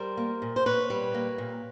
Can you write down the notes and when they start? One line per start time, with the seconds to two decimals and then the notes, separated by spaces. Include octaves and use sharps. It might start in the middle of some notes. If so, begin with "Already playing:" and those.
Already playing: G3 A#4 C5
0.17 A#3
0.42 A#2
0.56 C5
0.66 A#2 B4 C#5
0.90 G3
1.14 A#3
1.38 A#2